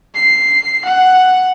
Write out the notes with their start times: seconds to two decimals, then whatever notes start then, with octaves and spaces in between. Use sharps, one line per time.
0.15 C7
0.84 F#5